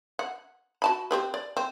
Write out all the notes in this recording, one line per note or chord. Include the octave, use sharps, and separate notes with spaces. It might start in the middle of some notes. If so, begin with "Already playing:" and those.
F#5
F#4 A5 B5
C4 G4 B4
D5
C4